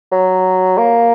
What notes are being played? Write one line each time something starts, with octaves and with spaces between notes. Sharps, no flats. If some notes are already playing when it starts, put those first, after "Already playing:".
F#3
A#3